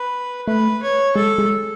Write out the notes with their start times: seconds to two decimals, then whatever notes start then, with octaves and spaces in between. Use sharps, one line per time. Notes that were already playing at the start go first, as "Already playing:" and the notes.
Already playing: B4
0.47 A3 B4
0.82 C#5
1.15 G#3 A4
1.38 G#3